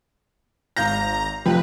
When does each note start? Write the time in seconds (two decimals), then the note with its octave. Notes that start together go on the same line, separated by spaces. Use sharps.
0.76 G#1 F5 A#5 G6 A#6
1.46 F1 F3 B4 G5